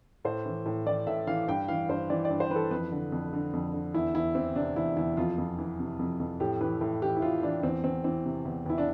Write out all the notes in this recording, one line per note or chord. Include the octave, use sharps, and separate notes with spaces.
A2 C5
E3
A2
E3 D5
A2 E5
E3 F5
G2 G5
E3 F5
G2 C5
E3 D5
D5
G2
C5
E3 A4 B4
F2 B4
D3
F2
D3
F2
D3
E2 E4
E2 E4
E3 C4
C3 D4
E2 E4
E2 E4
F2 F4
F2
E3
C3
F2
F2
A2 G4
E3 B4
A2
E3 G4
E4
A2 F4
E3 D4
E2 C4
E2 C4
E3 C4
C3
E2
E2 E4
D4